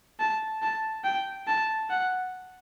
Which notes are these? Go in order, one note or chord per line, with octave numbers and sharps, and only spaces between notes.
A5
A5
G5
A5
F#5